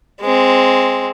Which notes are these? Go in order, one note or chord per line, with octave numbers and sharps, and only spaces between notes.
G#3 C4